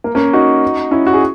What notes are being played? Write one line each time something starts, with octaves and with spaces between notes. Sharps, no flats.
A#3
A#3 C#4
D#4 F#4
C#4 E4
F#4
G#4